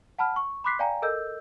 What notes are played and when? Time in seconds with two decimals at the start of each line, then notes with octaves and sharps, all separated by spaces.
0.18 F#5 A5 B5 F6
0.36 C#6
0.64 B5 C6 D6 F#6 B6 C7
0.79 D5 F5 G5 G#5 A#5
1.02 A4 A#4 D#5 E6 G6